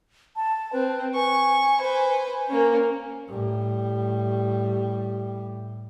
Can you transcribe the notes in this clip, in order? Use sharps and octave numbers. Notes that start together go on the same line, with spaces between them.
A5
C4 B4
G#5 C#6
B4 C5
A#3 C#4
A2 G3